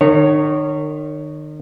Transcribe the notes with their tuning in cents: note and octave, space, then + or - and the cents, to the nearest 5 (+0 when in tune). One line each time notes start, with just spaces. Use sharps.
D#3 -35 C#5 +0